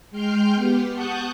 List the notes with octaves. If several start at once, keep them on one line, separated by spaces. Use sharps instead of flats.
G#3 G5 C6 F6 G6
B3 G4
F#5 A5 C#6 D#6 F#6 G6